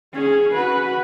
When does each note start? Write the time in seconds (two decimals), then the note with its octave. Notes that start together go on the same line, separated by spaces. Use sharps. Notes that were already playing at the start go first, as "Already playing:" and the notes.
0.14 C#4 G#4
0.53 F#4 B4